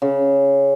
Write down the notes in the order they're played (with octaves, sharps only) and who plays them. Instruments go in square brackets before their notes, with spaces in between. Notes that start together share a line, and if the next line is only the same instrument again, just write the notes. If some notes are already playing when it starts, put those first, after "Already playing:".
[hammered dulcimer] C#3